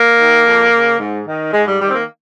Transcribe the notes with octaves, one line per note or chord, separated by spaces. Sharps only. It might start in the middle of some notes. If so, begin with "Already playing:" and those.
Already playing: A#3
D#3
F2
C#3
G#2
D#3
G#2 G#3
G3
D#3 G3
C4
A#3